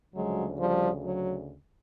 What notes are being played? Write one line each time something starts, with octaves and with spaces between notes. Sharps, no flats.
D2 C#3 F3 F#3 G#3
F3 G3
F#3